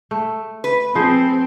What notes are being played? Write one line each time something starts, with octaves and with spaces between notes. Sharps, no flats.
A3
B4
F3 C4 G#4 C5